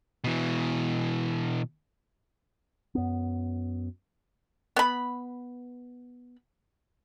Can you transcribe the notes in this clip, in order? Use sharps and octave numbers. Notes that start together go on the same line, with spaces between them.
B2 E3
F#2 B3
B3 B5